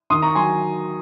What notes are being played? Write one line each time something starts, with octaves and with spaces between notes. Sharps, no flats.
D#3 C6 D#6
A#5 C#6
F#3 G#5 C6